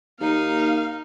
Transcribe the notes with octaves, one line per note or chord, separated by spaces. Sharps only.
D#2 A#3 D#4 F5